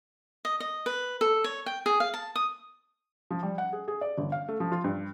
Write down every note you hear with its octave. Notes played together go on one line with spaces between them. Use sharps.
D#5
D#5
B4
A4
C#5
G5
G#4
F5
A5
D#6
F3
G3
F#5
G#4
G#4
D5
G1
F5
A3
F3
F4
G2